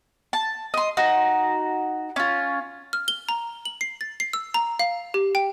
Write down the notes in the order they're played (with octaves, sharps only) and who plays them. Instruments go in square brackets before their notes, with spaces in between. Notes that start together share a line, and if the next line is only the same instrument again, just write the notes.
[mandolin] A5
D#5 C6
D#4 F#4
C#4 F4
[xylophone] F6
G7
A#5
F#7
C7
A6
C7
E6
A#5
F5
G4
G5